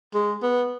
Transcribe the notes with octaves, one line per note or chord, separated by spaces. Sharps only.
G#3
B3